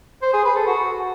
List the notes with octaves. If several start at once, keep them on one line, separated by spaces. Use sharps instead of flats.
C5
G#4
B4
A4
F#4